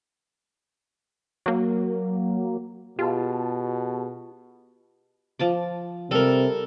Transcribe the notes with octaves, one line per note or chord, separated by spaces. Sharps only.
F#3 A#3
B2 F4 G4 G#4 A5
F3 A5 D6
C3 G3 A4 A#4